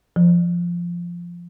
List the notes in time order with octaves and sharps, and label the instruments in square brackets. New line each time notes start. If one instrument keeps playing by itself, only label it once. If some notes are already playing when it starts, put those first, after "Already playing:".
[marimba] F3